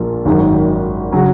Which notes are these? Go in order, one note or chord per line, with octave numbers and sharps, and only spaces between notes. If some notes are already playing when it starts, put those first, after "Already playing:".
Already playing: A#1 A#2 F3 A#3 F4
G#1 F#2 D#3
C#3 F#3 C#4